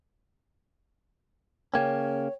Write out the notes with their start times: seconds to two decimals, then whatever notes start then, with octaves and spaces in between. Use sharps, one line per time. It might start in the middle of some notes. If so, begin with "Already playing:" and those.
1.74 C#3 A#3 C#4 C#5 G5 G#6